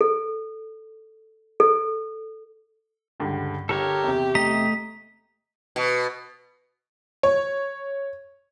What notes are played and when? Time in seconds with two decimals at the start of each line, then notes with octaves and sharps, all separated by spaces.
0.01 A4
1.60 A4
3.20 C#2 G2 D3
3.69 G1 G4 A4 A#4 C#5
4.04 E2 C3
4.35 A3 D#5 A#5 B6
5.76 B2
7.23 C#5